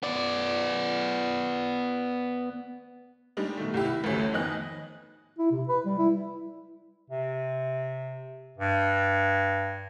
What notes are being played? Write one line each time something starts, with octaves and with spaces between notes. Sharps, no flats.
B3 D5
G3 G#3 D4 D#4
B2 D#3 A3
C2 E4 G4
E4
A1 D2 F#3 A3 C#4
F2 D#3 B3 D#5 G#5 F#6
E4
C3
B4
G3
E4
C3
G2